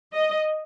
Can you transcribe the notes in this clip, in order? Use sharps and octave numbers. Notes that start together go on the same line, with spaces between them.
D#5